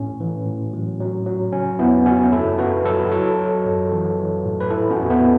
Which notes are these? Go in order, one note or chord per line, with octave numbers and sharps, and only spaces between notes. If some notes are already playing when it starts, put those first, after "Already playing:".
Already playing: A2 C#4
E3
A2
F#3
F#3
F#3
C#3 C#4
E2 B3 E4
C#3 C#4 F#4
F#2 E4 A4
F#2 F#4 B4
F#3 A4 C#5
F#3 A4 C#5
F#3
F#2
E3
E3
A2
B4
E3 E4 A4
C#4 F#4
E2
B3 E4